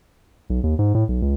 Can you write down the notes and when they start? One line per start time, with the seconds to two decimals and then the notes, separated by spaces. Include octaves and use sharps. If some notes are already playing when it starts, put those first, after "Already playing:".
0.50 B1
0.64 D#2
0.79 G#2
0.95 A2
1.09 B1
1.22 C#2